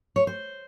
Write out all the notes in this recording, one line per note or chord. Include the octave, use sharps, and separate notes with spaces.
C#5
C5